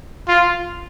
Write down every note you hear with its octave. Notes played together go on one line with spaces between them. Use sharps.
F4